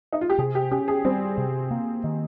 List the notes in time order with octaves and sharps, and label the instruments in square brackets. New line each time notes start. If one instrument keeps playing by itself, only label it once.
[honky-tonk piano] D#4
F4
G4
[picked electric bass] C3 [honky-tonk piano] G#4
[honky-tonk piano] G4
[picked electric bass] C#4 [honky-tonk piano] G4
[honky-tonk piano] G#4
[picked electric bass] G3 [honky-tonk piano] C4
[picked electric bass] C3
A#3
D#3